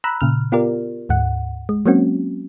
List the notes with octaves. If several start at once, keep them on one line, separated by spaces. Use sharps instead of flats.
A#5 B5 E6 F#6
A#2 C#3 F6
B3 F4 G4 A#4 D5
D2 G#2 F#5
G#3
F#3 G#3 A#3 C4 C#4 F#4